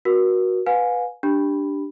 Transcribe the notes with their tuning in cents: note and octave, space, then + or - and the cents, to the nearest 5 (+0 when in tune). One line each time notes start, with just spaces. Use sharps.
F#4 +0 A#4 +35
B4 +0 F5 +45 G#5 +0
D4 +0 G4 +0 B5 +0